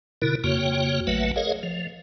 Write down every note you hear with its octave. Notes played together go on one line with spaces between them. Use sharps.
B2 D3 E4 A#4
F2 C#3 A#3 F#4 C#5 G5
A1 F#3 A3 B4 E5 F#5
G#4 A#4 C#5 D#5 F5
F3